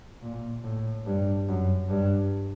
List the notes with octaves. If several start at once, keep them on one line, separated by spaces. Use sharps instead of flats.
A#2
A2
G2
F#2
G2